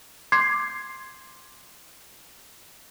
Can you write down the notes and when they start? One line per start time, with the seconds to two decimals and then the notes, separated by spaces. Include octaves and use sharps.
0.32 C6 D6 G6 G#6 C7